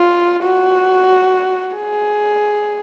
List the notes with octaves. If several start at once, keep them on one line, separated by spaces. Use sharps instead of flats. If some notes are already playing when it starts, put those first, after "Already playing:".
Already playing: F4
F#4
G#4